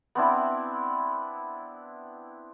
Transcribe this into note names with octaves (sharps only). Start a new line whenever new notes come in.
B3 C4 D4 E4